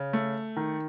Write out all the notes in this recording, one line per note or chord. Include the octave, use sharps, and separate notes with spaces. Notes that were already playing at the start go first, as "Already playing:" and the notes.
Already playing: C#3
A3
D#3